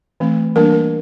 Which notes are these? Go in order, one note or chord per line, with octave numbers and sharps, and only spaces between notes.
E3 A3 C4
E3 G3 A#3 D4 A#4
A#4